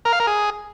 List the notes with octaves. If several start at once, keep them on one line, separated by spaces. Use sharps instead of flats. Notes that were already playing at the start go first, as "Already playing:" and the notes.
A#4
F5
A#4
G#4